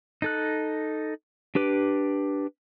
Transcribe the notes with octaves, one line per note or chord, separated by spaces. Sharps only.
D#4 A4 F#6
D4 G4 B4 D6